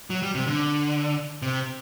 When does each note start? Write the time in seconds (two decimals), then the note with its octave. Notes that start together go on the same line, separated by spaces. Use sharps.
0.10 F#3
0.22 G3
0.35 C3
0.47 D3
1.42 C3